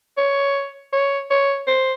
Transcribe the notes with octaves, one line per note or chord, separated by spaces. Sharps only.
C#5
C#5
C#5
C5